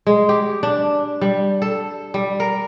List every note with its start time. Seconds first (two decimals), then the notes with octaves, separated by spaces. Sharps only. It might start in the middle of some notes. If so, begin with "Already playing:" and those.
0.07 G#3
0.29 G4
0.63 D4
1.21 G3
1.62 A4
2.14 G3
2.40 A#4